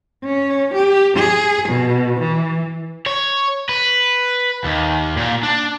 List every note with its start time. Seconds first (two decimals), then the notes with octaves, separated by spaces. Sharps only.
0.24 C#4
0.74 G4
1.17 G#4
1.69 B2
2.20 E3
3.06 C#5
3.69 B4
4.64 D#2
5.17 A#2
5.43 D4